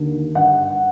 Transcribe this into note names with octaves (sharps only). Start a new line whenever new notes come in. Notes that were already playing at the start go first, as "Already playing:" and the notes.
Already playing: D#2 D3
G2 F#5